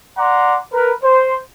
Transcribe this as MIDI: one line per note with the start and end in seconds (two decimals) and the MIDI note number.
0.18 0.57 74
0.18 0.57 78
0.18 0.57 82
0.18 0.57 84
0.18 0.57 86
0.72 0.91 70
0.72 0.91 71
1.03 1.35 72